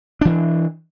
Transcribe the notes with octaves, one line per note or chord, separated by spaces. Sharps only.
E3 D4